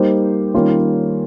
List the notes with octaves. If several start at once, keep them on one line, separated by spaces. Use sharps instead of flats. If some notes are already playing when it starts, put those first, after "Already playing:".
Already playing: G3 A#3 D#4 G4 C5
D#3 G3 A#3 C#4 F4